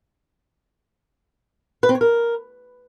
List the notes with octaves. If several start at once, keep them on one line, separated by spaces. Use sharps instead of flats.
B4
C4
C#5
A#4